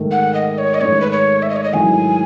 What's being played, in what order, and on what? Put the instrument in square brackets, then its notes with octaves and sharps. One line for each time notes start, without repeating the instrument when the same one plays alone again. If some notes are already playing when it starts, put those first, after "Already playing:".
Already playing: [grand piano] G#2 D#3 A3
[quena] F#5
D#5
C#5
D#5
[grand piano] G#2 D#3 A3 [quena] C#5
[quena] B4
C#5
E5
D#5
C#5
D#5
[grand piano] G#2 D#3 F#3 A3 E4 [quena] G#5